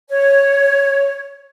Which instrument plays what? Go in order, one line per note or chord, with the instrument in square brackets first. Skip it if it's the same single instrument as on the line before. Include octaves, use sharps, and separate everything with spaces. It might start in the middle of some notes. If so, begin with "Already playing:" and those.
[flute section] C#5